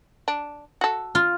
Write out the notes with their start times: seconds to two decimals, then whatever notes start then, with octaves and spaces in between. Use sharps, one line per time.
0.28 D4
0.81 F#4 A4
1.15 F4